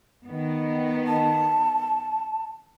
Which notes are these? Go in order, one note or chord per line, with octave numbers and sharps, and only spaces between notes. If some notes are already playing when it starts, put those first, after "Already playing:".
D#3 B3
A5